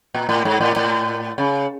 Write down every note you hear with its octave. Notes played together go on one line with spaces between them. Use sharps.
A#2
A2
G#2
A2
A2
C#3